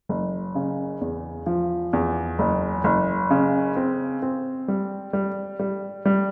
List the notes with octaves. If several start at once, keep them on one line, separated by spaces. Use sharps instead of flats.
F#1
C#3
E2
F3
E2
F#1
F#1
C#3
C4
C4
G3
G3
G3
G3